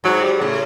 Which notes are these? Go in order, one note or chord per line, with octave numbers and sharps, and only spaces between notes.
G#2 F#3
G3
A2 C#3